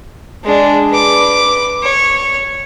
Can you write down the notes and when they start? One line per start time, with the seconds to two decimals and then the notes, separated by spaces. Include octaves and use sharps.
0.44 G#3 D4
0.91 B4 D6
1.82 C#5